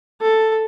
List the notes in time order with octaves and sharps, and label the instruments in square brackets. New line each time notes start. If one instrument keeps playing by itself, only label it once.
[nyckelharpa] A4